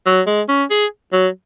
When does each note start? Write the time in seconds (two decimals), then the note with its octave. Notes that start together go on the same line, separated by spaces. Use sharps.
0.06 F#3
0.27 G#3
0.49 C#4
0.71 G#4
1.13 F#3